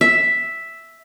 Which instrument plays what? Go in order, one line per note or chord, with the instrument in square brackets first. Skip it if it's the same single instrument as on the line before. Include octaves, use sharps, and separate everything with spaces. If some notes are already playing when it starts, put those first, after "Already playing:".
[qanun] E5